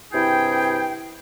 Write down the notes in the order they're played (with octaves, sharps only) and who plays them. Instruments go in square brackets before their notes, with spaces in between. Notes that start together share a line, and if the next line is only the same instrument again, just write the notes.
[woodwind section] G2 C3 E4 G#4 G5